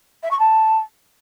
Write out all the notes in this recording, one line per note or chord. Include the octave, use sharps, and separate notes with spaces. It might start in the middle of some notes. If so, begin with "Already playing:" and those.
E5
C#6
A5